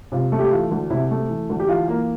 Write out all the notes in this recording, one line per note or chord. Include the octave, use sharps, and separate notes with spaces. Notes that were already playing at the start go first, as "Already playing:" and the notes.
C3 F4
A3
G4
E3 F4
D2
C3 E4
A3
E3
D2
G4
E3 F4
A#3